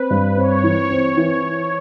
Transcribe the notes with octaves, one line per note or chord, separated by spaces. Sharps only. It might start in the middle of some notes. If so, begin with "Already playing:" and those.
Already playing: C4 B4
G2
C4 C#5
E3
C4
E3